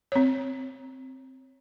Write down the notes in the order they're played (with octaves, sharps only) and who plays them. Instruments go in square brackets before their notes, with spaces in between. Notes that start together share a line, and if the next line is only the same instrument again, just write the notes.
[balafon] C4 C#5